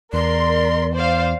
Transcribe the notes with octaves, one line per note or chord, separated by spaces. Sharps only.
E2 A#4 D5 C6
C5 D5 F5